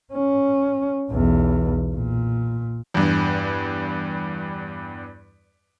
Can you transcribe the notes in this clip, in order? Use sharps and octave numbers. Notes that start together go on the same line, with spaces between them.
C#4
B1 E2
A#2
E2 G2